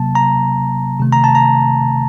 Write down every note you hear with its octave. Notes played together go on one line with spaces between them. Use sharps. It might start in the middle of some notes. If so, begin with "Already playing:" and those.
Already playing: C3 F#3 A#3 A5
A#5
C3 D#3 A3
A#5
A5
A#5